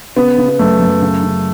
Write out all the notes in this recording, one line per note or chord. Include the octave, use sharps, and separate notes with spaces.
C#3 B3
C#3
B3
F#2 A3
F#2
C#3
C#3